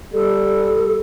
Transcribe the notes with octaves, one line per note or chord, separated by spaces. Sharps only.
G3 A4